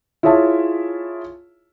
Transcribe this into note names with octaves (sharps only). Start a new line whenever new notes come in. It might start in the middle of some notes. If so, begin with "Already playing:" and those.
E4 F4 G#4 C#5 E5 A5